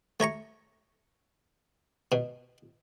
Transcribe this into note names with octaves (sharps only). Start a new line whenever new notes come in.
A3 C#5 A#5 C#6
B2